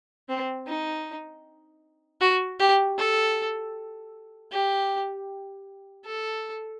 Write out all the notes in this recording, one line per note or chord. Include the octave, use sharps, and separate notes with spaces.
C4
D#4
F#4
G4
A4
G4
A4